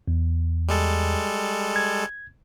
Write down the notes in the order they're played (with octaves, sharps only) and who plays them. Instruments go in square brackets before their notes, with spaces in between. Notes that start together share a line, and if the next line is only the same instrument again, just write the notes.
[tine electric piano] E2
[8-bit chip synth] G3 G#3 A4
[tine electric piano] G#6